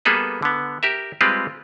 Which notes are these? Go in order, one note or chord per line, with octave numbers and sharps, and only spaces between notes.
G3 A#3 B3 G#4 A4 B4
D3 B3
G4 A#4 E5
G3 G#3 C4 F4 G4 B4